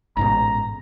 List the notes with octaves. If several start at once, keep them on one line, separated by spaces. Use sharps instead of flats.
A1 G#2 B2 A#5